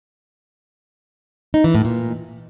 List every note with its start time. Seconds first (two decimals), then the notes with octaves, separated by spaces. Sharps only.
1.54 D#4
1.64 E3
1.75 A2
1.85 A#2